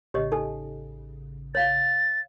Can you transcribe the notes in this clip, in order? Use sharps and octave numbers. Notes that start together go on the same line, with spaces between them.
A1 C#3 G4 C#5 D#5
D#4 A4 G#5
C#5 F5 A6